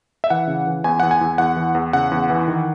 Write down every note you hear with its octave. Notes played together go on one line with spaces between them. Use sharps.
E5
E3 F#5
C#3
E3
E2 G#5
E2 F#5
G#5
E2
E2 F#5
E3
E2
C#3 F#5
E2
E3
D#3